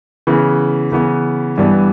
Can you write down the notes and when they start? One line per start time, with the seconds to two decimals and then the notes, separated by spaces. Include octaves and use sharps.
0.27 C#3 E3 B3
0.92 C#3 E3 B3
1.58 G2 E3 G3 B3 D4